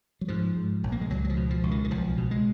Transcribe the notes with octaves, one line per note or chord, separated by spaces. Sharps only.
F#3
G#2 F3
G#2
A#1
A#3
G#3
C#2 F#3
F#3
F3
B2
F3
C#2
D#3
D#3
B1 F3
B2
G#3